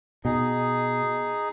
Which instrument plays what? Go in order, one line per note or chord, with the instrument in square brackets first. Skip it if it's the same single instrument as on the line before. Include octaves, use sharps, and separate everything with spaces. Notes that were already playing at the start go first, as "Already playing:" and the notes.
[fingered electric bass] B2 [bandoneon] D#4 G#4